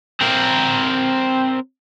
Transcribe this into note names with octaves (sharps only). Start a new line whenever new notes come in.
C4 A#4